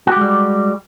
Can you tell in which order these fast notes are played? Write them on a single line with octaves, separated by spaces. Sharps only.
F#4 G4 G#3 G3